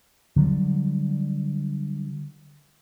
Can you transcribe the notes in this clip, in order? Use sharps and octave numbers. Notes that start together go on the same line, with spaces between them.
D3 F#3 G3